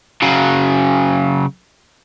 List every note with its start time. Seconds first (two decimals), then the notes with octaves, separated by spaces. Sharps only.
0.22 C#3 F#3